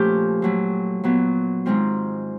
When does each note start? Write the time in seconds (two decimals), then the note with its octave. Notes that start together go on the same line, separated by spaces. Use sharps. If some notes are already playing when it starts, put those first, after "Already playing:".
Already playing: A#2 F3 A3 C#4 G4
0.42 A#2 F#3 A3
1.04 A#2 F#3 B3
1.66 G#2 D#3 G#3 C4 F4